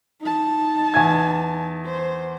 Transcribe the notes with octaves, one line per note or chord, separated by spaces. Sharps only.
D#4 A5
E2 G#5 G#6
C5